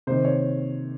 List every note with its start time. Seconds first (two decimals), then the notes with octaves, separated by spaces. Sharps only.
0.07 C3 D#3 C5
0.25 C#5